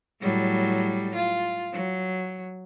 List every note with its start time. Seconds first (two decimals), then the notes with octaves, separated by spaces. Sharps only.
0.21 A2 F#3 G3
1.15 F4
1.72 F#3